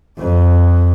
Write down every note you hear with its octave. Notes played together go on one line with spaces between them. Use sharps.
F2